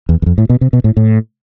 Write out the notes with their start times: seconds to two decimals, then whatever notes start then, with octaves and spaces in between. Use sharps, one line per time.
0.09 E2
0.22 E2
0.26 F2
0.38 A2
0.49 B2
0.61 C3
0.73 B2
0.84 A2
0.97 A2